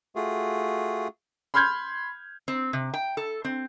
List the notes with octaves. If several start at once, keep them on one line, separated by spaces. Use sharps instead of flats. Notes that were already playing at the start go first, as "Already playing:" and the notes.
A3 F4 F#4 G#4
B5 C6 F6 G6 G#6
C4
C3
G5
A4
C4